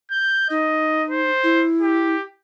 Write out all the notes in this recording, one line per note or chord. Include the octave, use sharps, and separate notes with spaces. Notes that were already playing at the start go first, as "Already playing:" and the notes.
G6
D#4 D#5
C5
E4
G4